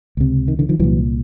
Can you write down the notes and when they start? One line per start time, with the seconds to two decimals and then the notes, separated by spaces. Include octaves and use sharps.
0.17 C#2 C3
0.48 D#3
0.59 D3 E3
0.69 D#3 F3
0.79 C2 A#2 E3 F#3